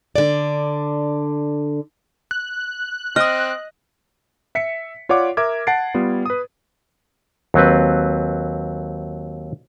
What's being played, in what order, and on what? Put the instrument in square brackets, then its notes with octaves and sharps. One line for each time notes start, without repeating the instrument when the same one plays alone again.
[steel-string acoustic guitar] D3 D5
[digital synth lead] F#6
[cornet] C4 [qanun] D#5 [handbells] D#6 F6
[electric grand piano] E5 B6 C#7
F4 C#5 D5 F#5 D6
A#4 E5 D6 G#6
F#5 A5 A6 C7 D7
G3 B3 F4
B4 D#6
[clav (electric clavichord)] D#2 F#3 C4 B4